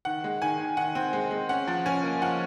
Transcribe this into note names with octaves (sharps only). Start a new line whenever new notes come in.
D#3 F#5
G#3
D#3 G#5
D#3
D#3 F#5
C4
G#3
G#3
C#4 F#5
F3
C#4 G#5
A#3
F3 F#5